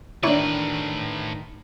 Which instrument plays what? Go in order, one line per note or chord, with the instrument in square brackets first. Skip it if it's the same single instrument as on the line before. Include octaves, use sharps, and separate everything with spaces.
[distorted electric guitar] A2 B4 [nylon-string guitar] D#3 D4 [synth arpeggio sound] E4 C#5 D5